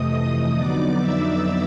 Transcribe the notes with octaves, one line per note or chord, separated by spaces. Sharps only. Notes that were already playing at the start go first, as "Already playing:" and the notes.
Already playing: F2 C3 E3 A3 D#5 D#6
F2 D3 F#3 B3 D#4 D5 D6
E5 E6